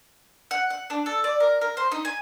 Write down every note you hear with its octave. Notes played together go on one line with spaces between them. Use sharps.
F#5
F#5
D4
A4
D5
A#4
A#4
C5
D#4
G#5